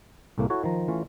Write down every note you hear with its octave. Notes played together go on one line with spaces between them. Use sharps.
C2 A2 A3 A#3
E4 F#4 A4 C#5
D#3 F3 A#5
E3 A3 C#4 F4